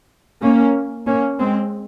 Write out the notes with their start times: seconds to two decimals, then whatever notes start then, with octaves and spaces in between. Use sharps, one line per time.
0.41 A#3 C#4
1.07 A#3 C#4
1.39 G#3 C4